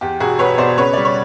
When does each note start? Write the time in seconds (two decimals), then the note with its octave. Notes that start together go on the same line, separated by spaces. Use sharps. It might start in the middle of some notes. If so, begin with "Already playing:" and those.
0.01 E2 G4
0.20 E1 F#4 G#4
0.39 E1 B4 C#5
0.58 B2 C5 D5
0.78 C#3 B4 C#5
0.93 G3 D5
1.05 C#5